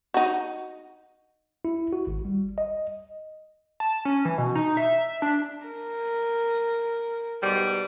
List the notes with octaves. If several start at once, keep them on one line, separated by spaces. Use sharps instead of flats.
D#4 F#4
E4
F#4
G#1
G3
D#5
A5
C#4
E3
B2
D#4
E5
D4
A#4
G#2 B2 G3